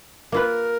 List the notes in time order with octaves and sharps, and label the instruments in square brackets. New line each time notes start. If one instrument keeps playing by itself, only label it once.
[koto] A#3 F4 B4 [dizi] A#4